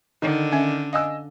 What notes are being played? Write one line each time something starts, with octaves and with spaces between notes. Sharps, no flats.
D3 D#3 D#4
C#4 E5
D#5 F5 G#5 E6